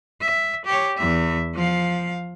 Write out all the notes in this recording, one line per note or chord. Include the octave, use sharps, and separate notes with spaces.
E5
G4 C#5
E2 E5
F3 F5